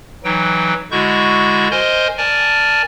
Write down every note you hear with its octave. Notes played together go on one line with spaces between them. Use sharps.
E3 F#3 D#4 G5
D3 G#3 E4 F#4 C#6 G6
A#4 C5 D#5 G#5 C6 G6
A#4 D5 G#5 A5